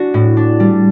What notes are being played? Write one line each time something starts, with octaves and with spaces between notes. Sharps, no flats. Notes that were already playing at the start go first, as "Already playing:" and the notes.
Already playing: D4 F#4
A2
D4
G3